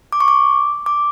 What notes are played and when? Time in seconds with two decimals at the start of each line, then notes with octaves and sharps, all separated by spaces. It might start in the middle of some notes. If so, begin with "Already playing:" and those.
0.13 D6
0.20 C#6
0.28 D6
0.86 D6